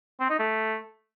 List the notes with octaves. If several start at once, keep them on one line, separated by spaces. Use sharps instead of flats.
C4
D#4
A3